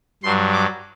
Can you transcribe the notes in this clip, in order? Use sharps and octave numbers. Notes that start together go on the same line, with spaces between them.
G2 F#3 C6
D6